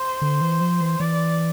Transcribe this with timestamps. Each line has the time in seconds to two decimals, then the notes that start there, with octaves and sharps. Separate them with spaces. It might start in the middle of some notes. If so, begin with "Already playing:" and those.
Already playing: C5
0.22 D3
0.41 E3
0.61 F3
0.81 E3
0.99 E3 D5